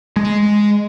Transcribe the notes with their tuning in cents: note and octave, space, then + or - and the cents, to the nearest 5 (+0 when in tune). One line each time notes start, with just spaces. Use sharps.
G#3 +0